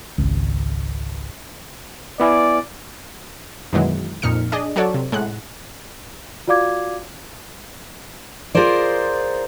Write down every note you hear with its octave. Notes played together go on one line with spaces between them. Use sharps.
G#1 C#2
B3 E4 D5 G#5
F#2 B2 D#3 E3 F#3 G#3
F2 A#2 D#4 F6 C#7
D4 G#4 D5 D#5
F#3 F#4 A4 C#5 D5
C3
A2 G#3 F#5 F#6
F4 F#4 D5 F5 D6 G#6
F4 G#4 A#4 C5 D5